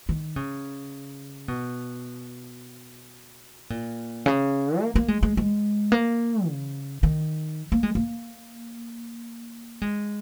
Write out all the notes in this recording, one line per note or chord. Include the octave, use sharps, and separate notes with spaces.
D#3
C#3
B2
A#2
C#3
A#3
A#3
G#3
G#3
G#3
A#3
C#3
D#3
A#3
G#3
A#3
G#3